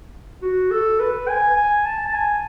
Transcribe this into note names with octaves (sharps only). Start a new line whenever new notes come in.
F#4
A4
B4
G#5
G#5
A5
A5
G#5